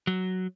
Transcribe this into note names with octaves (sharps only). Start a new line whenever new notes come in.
F#3